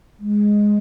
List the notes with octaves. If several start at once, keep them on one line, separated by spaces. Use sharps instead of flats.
G#3